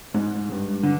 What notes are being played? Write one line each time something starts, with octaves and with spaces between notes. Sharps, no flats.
G#2
G2
D3